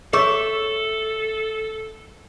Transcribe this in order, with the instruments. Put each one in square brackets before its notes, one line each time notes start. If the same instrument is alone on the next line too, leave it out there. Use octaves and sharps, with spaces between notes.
[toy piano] G#4 C#5 C#6 [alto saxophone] A4 [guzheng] E5